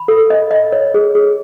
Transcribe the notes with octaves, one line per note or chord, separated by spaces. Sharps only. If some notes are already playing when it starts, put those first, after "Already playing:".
Already playing: B5
A4
D#5
D#5
C#5
G#4
G#4